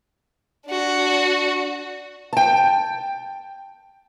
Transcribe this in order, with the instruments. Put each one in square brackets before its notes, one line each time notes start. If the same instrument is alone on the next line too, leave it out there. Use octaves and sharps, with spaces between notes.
[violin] D4 F#4
[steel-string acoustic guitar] G5 A5